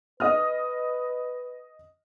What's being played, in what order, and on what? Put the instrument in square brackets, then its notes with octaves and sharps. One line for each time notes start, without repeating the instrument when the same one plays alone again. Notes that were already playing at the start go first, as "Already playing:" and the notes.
[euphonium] B4 [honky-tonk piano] D#5 D#6 F6